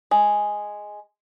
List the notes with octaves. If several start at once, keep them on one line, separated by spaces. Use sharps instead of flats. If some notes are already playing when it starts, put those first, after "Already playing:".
G#3